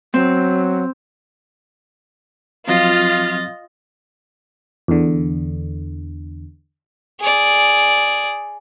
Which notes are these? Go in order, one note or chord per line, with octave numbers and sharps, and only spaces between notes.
F#3 C4
F3 F#3 C4 F4 D#5 F6 A6
E2 D3
G#4 D5